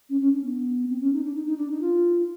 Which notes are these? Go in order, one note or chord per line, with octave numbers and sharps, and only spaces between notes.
C#4
C#4
D4
B3
C4
C#4
D#4
D4
D#4
D#4
D4
D#4
F4